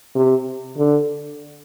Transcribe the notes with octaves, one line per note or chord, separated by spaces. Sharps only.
C3
D3